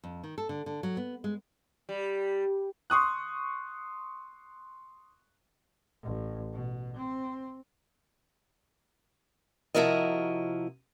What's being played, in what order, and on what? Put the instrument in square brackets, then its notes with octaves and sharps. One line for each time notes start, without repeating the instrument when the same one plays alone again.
[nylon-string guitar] F2
D#3
A4
D3
D3
F#3
B3
G#3
[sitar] G3
[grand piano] C6 C#6 D#6 F#6
[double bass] A1
B2
C4
[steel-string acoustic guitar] C3 F3 E4 F#4 A#4 D#5